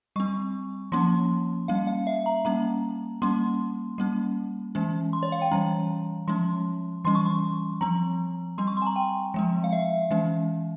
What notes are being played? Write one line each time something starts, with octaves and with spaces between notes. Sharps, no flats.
G3 C4 C#6
F3 A#3 C#4 C6
G3 A#3 C#4 F5
F5
E5
A#5
G3 A#3 C#4 A#5
G3 A#3 C#4 C6
G3 A#3 C#4
E3 G#3 C#4
C6
C#5
F5
G5
E3 G3 C#4 A#5
F3 G#3 C#4 C6
E3 G3 C#4 C6
C#6
C6
F3 C4 A#5
G3 C4 C6
C#6
C6
G#5
A#5
G5
F3 G#3 C4
F5
E5
E3 G#3 C#4